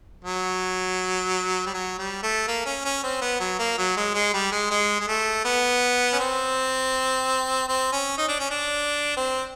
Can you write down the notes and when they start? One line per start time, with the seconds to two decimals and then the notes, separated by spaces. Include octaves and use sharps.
0.24 F#3
1.66 G3
1.74 F#3
1.98 G3
2.23 A3
2.47 A#3
2.66 C#4
2.85 C#4
3.03 C4
3.21 B3
3.40 F#3
3.59 A#3
3.78 F#3
3.97 G#3
4.14 G#3
4.34 G3
4.52 G#3
4.70 G#3
5.00 G#3
5.08 A3
5.45 B3
6.13 C#4
6.19 C4
7.68 C4
7.92 C#4
8.17 D#4
8.28 D4
8.39 C#4
8.51 D4
9.16 C4